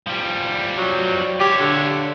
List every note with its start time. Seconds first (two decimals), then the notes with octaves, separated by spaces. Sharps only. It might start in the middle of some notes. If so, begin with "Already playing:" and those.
0.07 F3 G3
0.77 F#3
1.40 F4 G4 C#5
1.60 D3